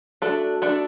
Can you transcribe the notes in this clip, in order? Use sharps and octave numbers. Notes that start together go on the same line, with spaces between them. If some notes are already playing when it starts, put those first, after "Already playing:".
A3 D4 F#4 A4 D5
A3 D4 A4 D5